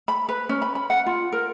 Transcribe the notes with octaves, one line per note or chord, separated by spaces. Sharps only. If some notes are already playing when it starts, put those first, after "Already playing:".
B5
B4
C#4
B5
B5
F#5
F4
A#4